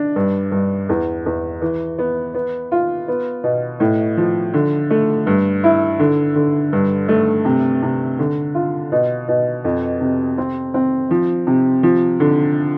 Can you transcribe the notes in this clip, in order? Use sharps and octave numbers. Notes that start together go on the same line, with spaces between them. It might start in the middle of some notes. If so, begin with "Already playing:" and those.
Already playing: D4
G2
G2
E2
E2
E3
B3
B3
F4
B3
B2
A2
F3
D3
A3
G2
E4
D3
D3
G2
A3
C3
C3
D3
F4
B2
B2
F2
C3
C4
C4
F3
C3
F3
D3